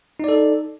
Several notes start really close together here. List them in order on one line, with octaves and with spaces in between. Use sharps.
D#4 D5 A4